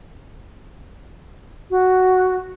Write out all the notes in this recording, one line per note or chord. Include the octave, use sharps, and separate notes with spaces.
F#4